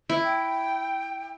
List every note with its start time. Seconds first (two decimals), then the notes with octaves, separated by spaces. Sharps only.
0.09 E4
0.24 G5